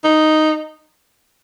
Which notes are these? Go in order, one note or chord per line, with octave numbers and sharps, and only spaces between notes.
D#4